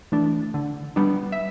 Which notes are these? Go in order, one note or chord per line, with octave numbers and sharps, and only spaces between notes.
E3 A3 D4
D3
G3 B3 D4
E5